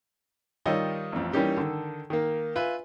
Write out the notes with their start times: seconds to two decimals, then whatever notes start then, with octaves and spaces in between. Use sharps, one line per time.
0.66 D#3 G3 F4 C#5 D#5 E6
1.12 A1 F2
1.33 E3 G3 A#3 C#4 D#4 G4
1.57 D3 D#3 A4
2.10 D#3 A#3
2.56 F4 B4 E5 G#5